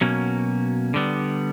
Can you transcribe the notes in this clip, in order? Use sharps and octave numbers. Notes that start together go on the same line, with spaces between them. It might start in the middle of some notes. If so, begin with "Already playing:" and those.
B2 F#3 A#3 C#4
D3 G3 B3